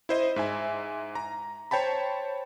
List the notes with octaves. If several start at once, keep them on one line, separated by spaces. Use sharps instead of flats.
E4 C5 D#5
G#2 E5 G#5
A#5
C5 C#5 G5 A5 B5